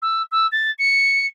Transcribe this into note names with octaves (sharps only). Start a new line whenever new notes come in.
E6
E6
A6
C#7